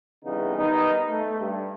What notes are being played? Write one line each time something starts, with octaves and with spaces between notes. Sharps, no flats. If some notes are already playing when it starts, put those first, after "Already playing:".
F2 C#3 E3 G3 B3 D#4
D#3 G3 B3 D#4
A3
G2